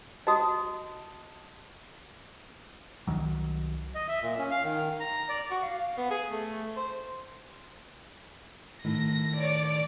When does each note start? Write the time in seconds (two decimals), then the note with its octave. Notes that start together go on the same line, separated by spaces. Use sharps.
0.27 F#4 D#5 A5 D#6
3.07 C2 D#3 F#3
3.95 D#5
4.08 E5
4.22 A#2
4.38 C#4
4.51 F5
4.64 D#3
5.00 A#5
5.29 D5
5.51 F#4
5.63 F5
5.98 B3
6.11 G#4
6.29 A3
6.76 C5
8.85 A2 D#3 A#6
9.39 C#5 D5 D6